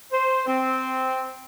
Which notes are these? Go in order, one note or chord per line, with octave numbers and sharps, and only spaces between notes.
C5
C4